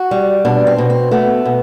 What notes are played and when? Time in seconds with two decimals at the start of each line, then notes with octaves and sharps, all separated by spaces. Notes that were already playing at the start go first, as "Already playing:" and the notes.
Already playing: F#4
0.11 G3
0.45 B2 D4
0.67 C4
0.78 B2
0.90 C4
1.11 A3 B3
1.45 B2